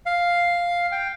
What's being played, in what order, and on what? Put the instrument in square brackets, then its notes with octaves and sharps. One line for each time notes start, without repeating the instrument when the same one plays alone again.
[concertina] F5
G5